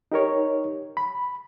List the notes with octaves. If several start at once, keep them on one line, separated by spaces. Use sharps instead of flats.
D#4 G4 A#4 C#5
B5